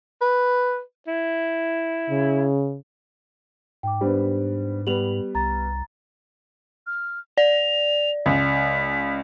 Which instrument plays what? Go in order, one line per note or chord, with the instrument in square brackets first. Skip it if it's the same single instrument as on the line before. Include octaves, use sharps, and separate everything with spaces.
[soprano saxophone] B4
E4
[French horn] C#3
[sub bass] G#2 [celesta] G5 D6
[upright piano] G3 B3 [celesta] D4 C5
[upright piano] G3 B3 [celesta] F7 F#7
[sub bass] C2 [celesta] A#5 A6
[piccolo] F6
[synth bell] D5 [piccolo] F7
[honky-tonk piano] C#2 [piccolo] B6